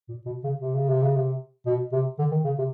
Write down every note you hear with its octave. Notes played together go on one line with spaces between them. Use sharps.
A#2
B2
C#3
C3
C#3
C3
C#3
C3
B2
C3
D3
D#3
C#3
C3